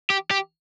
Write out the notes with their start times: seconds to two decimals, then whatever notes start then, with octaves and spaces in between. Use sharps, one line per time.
0.10 G4
0.31 G4